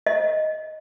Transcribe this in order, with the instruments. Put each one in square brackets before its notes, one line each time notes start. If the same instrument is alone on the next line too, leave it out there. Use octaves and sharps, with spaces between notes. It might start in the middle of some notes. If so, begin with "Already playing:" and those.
[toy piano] D#5